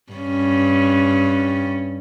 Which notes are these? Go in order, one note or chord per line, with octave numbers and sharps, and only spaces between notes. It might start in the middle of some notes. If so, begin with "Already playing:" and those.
G2 C#4